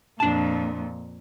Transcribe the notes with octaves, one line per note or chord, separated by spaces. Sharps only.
F2 A#2 D4 A5